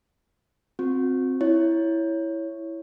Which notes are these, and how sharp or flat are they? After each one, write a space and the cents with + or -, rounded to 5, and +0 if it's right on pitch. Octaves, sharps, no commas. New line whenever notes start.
C4 +0 F#4 -45
E4 +0 C#5 +0